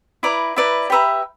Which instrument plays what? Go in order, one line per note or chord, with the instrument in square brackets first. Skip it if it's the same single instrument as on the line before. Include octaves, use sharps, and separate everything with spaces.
[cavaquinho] E4 B4 D5 A#5
E4 B4 D5 A#5
G4 B4 E5 A#5